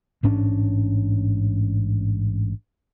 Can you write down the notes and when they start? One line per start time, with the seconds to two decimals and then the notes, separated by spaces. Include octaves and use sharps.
0.23 A1 G#2 C#4 D4